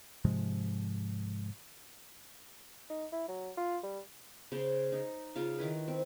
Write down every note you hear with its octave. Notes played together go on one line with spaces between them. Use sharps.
G#2 C3 F3 G#3
D#4
E4
F#3
F4
G3
C#3 C5
D#4
C#3 F4 F5
D#3 E4 B4
C4